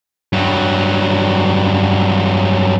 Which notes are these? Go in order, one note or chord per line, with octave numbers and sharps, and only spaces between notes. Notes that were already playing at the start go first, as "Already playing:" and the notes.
G2 F#3